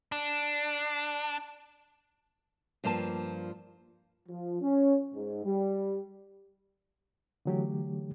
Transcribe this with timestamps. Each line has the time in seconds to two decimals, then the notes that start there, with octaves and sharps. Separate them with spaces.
0.12 D4
2.84 G2 F3 A#3 F4 A5
4.28 F3
4.62 C#4
5.14 G#2
5.44 G3
7.46 D3 E3 F#3 A3 G4